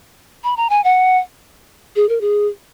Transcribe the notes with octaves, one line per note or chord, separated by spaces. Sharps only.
B5
A#5
G#5
F#5
G#4
A#4
G#4